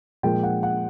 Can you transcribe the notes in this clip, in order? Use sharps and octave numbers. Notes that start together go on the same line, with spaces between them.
A#2 F3 G#3 G5
F#5
F#5